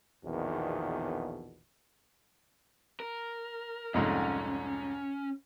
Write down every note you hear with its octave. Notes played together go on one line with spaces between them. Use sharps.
A#1 E2 B2 D#3
A#4
C2 F2 G#2 C#4